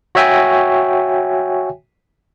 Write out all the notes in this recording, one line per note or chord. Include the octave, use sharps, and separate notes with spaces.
F#4 C#5 E5 G5 G#5